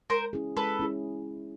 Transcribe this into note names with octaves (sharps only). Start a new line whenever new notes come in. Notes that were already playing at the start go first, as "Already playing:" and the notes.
G#3 A#4 C5
C#4 E4 G#4
G#3 A4 B4
C#4 E4 G#4